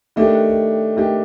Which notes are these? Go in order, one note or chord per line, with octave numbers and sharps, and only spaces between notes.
D#3 A3 D4 G4
D#3 A3 D4 G4